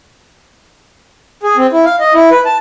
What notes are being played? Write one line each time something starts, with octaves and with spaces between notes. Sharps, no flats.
G#4
C4
E4
F5
D#5
E4
B4
A5